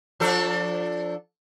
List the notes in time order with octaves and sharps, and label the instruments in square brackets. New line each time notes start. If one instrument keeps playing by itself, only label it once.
[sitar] F3 D4 A4